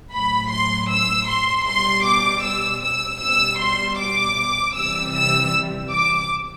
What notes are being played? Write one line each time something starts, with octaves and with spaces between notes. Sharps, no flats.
A2 F#3 B5
C6
E6
C6
B2 G3 C6
D6
E6
E6
B2 G3 E6
C6
D6
C3 E3 G3 E6
E6
D6